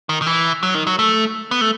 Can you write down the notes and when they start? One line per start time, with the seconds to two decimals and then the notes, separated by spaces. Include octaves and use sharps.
0.09 D#3
0.22 D#3
0.27 E3
0.63 F#3
0.74 D#3
0.87 F#3
0.99 A3
1.51 B3
1.61 A3